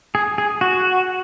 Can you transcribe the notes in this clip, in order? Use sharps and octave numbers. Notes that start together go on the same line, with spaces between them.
G#4
G#4
F#4